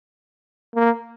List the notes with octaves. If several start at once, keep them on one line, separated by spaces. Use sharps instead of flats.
A#3